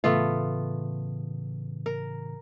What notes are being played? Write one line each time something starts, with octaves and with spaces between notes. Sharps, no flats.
A2 C#3 E3 A3 B3 F4
A#4